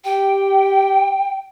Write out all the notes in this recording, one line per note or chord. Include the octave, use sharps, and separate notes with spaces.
G4 G5